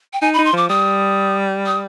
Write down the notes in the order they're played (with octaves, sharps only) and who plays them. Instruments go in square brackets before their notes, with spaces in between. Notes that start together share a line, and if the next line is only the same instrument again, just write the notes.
[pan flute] G5
[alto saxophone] D#4 [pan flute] G#5
[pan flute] B5
[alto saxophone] D#4
[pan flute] C6
[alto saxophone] F3 [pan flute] D6
[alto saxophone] G3 [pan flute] D#6
[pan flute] D#6